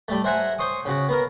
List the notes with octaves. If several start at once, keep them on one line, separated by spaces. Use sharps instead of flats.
G3 A3
C5 E5 F#5 G#5 A#5
C5 C6 C#6 D#6
C#3 F#4
B3 A#4